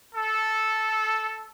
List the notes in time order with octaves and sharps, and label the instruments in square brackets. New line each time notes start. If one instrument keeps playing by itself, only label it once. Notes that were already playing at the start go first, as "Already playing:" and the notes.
[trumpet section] A4